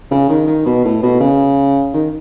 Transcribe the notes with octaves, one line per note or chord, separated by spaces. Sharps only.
C#3
D#3
D#3
B2
A2
B2
C#3
D#3